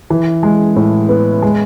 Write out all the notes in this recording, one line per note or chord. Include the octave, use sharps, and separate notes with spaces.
E3
G#3
A2
B3
G#3